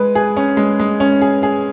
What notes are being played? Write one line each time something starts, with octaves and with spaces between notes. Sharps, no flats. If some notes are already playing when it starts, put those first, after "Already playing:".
Already playing: G#3 B4
G#4
C#4
G#3
G#3
C#4
G#4
G#4